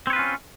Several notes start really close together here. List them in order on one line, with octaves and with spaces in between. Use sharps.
C4 C#5 B4 F4 C#4